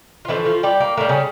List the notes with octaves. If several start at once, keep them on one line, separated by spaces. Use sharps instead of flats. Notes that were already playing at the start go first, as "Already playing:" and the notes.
F4
D3 E3 F3 A3 E4
F3 F4
G3 G4
A#3
A2 G3 A#3
C#3 C#4